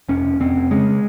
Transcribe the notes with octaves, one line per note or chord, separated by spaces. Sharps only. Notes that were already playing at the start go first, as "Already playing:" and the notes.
F1 C#4
F1
F1 C4
F1
C#3 G#3